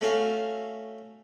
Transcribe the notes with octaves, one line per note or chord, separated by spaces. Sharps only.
A3 C#4 F#4 E5 F5